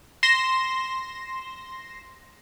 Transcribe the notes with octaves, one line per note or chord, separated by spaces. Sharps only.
C6 A#6 E7